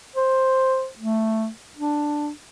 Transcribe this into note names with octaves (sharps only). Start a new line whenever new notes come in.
C5
A3
D4